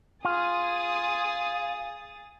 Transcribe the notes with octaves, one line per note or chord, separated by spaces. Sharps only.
F4 G#4 D#6 A6